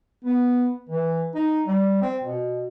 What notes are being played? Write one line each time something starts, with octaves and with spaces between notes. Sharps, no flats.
B3
E3
D#4
G3
C4
B2